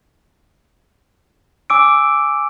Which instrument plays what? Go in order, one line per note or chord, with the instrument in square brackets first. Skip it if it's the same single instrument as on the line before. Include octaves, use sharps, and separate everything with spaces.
[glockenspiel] G#5 D6 E6 D7